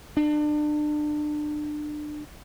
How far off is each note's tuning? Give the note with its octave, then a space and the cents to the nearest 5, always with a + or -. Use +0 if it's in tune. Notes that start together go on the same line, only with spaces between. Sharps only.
D4 +30